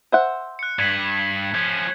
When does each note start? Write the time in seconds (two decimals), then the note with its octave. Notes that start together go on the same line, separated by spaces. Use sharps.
0.12 C5 E5 F#5
0.59 F#6 C#7
0.79 G2 G#6 B6 F#7
1.55 F3 C#4 G#6